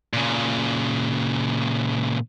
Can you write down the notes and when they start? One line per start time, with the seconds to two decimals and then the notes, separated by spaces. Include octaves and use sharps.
0.13 A#2 C#3